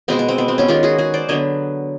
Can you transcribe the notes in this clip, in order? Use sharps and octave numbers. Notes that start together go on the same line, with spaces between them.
B2 G#3 B3 C4
B3
C4
B3
C4
B3 C#4
D#3 G#3 B3 F4 G4
F#4 G#4
F#4 G#4
C5 D5
D3 F#3 B3 C#5 D#5